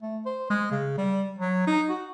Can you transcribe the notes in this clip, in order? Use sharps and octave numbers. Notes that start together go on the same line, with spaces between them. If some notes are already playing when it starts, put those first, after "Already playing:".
A3
C5
G#3
C#3
G3
F#3
D#4
F#4